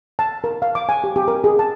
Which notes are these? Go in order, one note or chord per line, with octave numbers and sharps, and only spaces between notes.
A5
A#4
F5
D6
G#5
G4
G4
A#4
G#4
A5